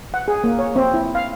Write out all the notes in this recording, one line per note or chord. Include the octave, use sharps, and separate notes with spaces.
F#5
G#4
A#3
C#5
C4
E4
F5